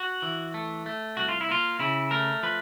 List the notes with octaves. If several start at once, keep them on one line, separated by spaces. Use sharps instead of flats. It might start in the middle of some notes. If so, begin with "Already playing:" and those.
Already playing: F#4
E3
A3
A3
C2 F#4
F4
E4
A#3 F4
C#3 E4
A3 A#4
F3 B4